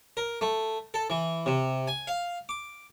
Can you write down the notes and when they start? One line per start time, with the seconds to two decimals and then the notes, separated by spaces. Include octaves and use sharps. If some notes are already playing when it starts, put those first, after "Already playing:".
0.17 A#4
0.41 A3
0.94 A4
1.10 E3
1.46 C3
1.88 G#5
2.07 F5
2.49 D6